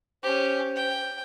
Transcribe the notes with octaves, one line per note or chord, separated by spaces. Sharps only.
C#4 G4 C5
G5